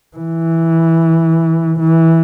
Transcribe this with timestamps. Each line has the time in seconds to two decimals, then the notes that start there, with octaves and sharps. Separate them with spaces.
0.16 E3
1.80 E3